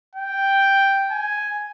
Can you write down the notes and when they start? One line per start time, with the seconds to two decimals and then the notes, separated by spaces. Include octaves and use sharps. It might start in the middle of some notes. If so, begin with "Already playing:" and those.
0.15 G5
1.11 G#5